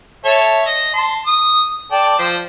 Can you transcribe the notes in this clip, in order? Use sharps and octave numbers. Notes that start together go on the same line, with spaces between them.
A4 C#5 E5
D#5
A5 C6
D#6
A4 D5 G5
F3 C5